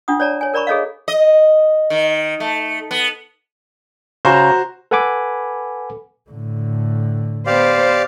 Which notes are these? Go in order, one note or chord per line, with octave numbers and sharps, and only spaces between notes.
D4 F4 F#5 D#6
C#5 D5 A5 A#5
C#5 G#5
A#4 D5 A#5 B5 C#6
G#4 A4 C#5 D#5 F5
D#5
D#3
A3
B3
C#3 F#4 C5 A#5
A4 B4 F#5 G#5 B5 D6
A2 D3
B3 G4 C5 D5 F5